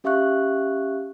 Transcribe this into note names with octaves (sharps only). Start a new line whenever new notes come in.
C#4 G4 E5 F5 C#6 F#6